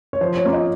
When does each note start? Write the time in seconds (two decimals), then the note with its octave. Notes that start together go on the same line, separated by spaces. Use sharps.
0.13 C#5
0.21 F3 C5
0.37 C#5
0.45 A#3 C#4 F4
0.53 D#5